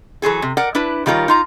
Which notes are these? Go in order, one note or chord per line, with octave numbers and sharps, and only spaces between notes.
E3 F#3 G#4 A4
C3
A#4 D5 F#5
D4 E4 B4
D#3 G3 F4 G#4 A#4 C#5
D#4 F4 A#5